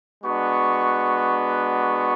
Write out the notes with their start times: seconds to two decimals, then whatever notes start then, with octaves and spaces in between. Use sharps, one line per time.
0.23 G#3 B3 D4 F#4 C#6
1.82 C#6